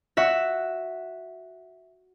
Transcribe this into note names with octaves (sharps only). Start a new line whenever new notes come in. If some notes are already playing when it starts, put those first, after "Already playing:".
F#4 E5